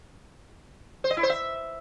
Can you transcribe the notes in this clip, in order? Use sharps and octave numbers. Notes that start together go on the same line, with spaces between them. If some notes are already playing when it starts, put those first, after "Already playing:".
C5
D#5
E4
C5
E5